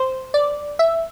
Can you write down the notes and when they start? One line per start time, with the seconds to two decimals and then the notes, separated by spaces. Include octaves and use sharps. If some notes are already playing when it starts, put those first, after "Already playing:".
Already playing: C5
0.34 D5
0.79 E5